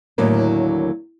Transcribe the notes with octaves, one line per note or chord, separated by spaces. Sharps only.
D#2 A2 D3 F#3 A#3 D4